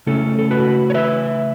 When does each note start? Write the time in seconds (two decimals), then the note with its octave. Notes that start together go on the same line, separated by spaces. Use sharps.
0.07 C#3 A3 C#4 E4 A4
0.39 A4
0.51 F#4 B4
0.90 C#5
0.94 B4 E5